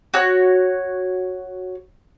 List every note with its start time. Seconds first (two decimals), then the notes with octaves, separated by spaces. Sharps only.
0.14 F#4 C#5 F#6